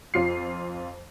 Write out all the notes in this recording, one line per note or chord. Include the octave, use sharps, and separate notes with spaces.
F2 F4 C7